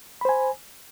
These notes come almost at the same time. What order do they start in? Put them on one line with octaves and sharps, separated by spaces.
B5 C5 G#5